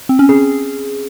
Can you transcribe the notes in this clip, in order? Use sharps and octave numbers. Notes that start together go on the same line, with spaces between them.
C4
C#4
G#4